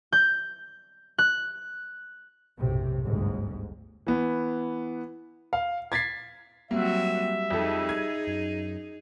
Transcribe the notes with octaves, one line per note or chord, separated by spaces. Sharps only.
G6
F#6
B1 F#2 A2 C3
G1 D2 G#2
E3 B3
F5
G#6 A6 B6 C7
F#3 G3 A#3 C4 F#4 E5
F2 D#4 G#4 A4
G#6
F#2